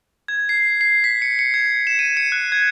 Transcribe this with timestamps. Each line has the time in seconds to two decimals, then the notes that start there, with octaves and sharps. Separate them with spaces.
0.28 G#6
0.49 C7
0.81 C7
1.04 B6
1.22 C#7
1.39 C#7
1.54 G#6
1.87 E7
1.99 D#7
2.17 C#7
2.32 F#6
2.52 G#6